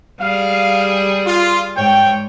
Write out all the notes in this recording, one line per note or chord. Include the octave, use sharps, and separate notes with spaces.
G3 G#4 F5
F4
G#2 C#5 G5